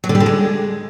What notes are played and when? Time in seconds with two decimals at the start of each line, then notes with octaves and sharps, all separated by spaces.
0.04 F#3
0.09 D3
0.15 G3
0.20 D3
0.26 G#3